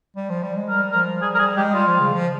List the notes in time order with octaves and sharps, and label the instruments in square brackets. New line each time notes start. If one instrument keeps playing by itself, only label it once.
[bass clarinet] G3
F3
G3
G#3
[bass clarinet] G3 [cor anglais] A#4
[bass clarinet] F3 [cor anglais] A#4
[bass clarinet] G3 [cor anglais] G#4
[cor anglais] A#4
[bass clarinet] G3 [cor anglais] G#4
[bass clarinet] G#3 [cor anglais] G4
[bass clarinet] G3 [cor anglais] F4
[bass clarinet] F3
C#3
F3